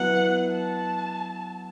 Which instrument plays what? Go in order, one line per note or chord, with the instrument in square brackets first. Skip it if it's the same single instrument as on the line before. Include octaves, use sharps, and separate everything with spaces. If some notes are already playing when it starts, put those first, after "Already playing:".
Already playing: [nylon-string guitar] F#3 B3 E4 [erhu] F#5
[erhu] A5